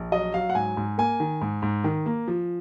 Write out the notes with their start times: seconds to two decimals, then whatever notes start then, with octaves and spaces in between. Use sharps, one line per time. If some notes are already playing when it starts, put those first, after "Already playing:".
Already playing: A#1
0.12 F#3 D#5
0.34 F#3 F5
0.50 F#5
0.55 G#2 G#5
0.77 G#2
0.98 A#3 G#5
1.20 D#3
1.41 G#2
1.62 G#2
1.84 D#3
2.06 A#3
2.28 F3